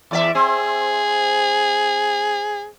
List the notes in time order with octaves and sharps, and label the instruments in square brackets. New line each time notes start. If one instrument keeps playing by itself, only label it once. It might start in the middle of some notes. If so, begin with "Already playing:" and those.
[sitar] E2 D5 E5
[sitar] C4 [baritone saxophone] G#4